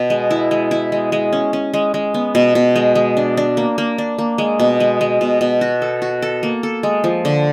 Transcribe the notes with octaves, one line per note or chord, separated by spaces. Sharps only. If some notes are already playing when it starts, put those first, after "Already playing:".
Already playing: B2
G#3
E4
G#3
E4
G#3
G#3
C#4
C#4
G#3
G#3
B3
B2
B2
G#3
G#3
D4
D4
A#3
A#3
D4
A#3
G#3
B2
G#3
G#3
B2
B2
F#4
A4
F#4
A4
A#3
A4
G#3
F3
D3